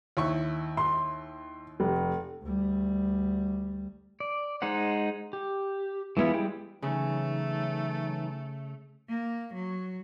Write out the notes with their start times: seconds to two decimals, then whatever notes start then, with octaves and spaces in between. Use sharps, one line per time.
0.17 D#2 E4 C#6
0.77 C6
1.80 F1
2.42 D2 G3
4.20 D5
4.62 G#3 D#4 C5 F#5
5.33 G4
6.17 E3 G#3 B3 E4 F4
6.34 G3 G#3 E4 G5
6.82 C#3 E3 F#3 A3 D#4
9.09 A#3
9.54 F#3